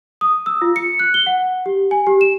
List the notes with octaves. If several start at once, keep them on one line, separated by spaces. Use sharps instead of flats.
D#6
E6
F4
C#7
F#6
G7
F#5
G4
G#5
G4
E7